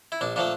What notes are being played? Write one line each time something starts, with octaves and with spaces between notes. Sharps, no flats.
E4
A#1 D4
A#2 F3 A3 D4